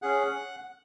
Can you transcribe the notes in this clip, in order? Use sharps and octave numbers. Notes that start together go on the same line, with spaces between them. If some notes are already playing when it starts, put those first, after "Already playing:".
C#4 G#4 F#5